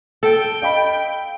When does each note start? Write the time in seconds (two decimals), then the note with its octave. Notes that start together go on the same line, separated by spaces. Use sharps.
0.23 A4 G5
0.62 D#5 F5 B5